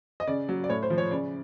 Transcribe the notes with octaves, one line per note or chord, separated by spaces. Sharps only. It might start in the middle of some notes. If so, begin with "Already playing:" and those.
D#5
C#3 D5
F#3
D5
A2 C#5
C5
F3
C#5
C#3 D5